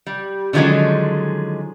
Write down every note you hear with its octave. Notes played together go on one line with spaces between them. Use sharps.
G3
D3 D#3 F3 F#3 G#3 C#4